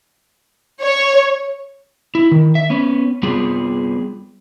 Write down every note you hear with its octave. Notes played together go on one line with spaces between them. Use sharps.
C#5
E4
D#3
E5
B3 C#4
G3 B3 F4 G#4